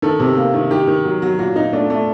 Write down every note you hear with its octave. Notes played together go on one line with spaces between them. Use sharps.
D#3 A4
C3
A#3
D#3
D#3 G4
D#3
F#3
F#3
A#2 F#4
A#2 D#4
A3 D4
A3